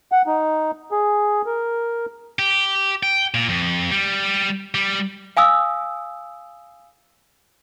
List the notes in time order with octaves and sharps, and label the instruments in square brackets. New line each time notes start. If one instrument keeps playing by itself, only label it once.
[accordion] F#5
D#4
G#4
A#4
[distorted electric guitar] G4
G5
A#2
F2
G3
G3
[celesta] F5 G#5 D#6 E6